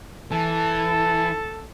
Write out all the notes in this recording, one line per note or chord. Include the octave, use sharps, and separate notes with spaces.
E3 A4 A5